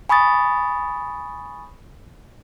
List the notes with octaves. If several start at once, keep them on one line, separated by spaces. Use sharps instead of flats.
G#5 B5 C#6 D#6 A6